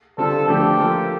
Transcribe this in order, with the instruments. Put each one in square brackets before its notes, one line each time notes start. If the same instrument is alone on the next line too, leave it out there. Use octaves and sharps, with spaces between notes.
[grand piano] D3 G3 C4 F4 [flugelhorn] A4
[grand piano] D3 F3 A3 D4 [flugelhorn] G4
[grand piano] F3 A#3 F4 A4